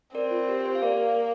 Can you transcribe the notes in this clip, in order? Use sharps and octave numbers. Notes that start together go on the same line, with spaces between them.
C4 A#4 D5
F4
G4
G4 C5
F5
A#3 A#4 D5